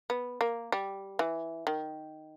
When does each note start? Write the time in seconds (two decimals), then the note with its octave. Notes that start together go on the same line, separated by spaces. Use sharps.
0.10 B3
0.41 A#3
0.72 G3
1.19 E3
1.67 D#3